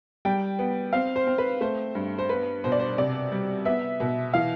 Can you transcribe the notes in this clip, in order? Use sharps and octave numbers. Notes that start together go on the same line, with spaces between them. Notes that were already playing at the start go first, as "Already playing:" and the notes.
G3 G5
B3
C4 F5
C5
C4
B4
A3 C5
G2
C5
B3 B4
B2 C5
D5
C5
C3 D5
G3
B3 E5
B2
E3 F5